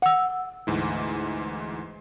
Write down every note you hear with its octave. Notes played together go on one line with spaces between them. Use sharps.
F#5 E6
D2 G#2 E3